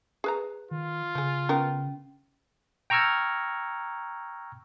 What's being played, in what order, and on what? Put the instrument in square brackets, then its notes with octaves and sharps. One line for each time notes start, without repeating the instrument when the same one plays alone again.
[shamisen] G#4 B4 A#5
[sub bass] D#3 [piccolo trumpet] F4
[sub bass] C#3 [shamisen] F3 G#4
[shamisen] B3 A#4 [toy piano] C#4
[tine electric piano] G5 A#5 C#6 E6 F6 G#6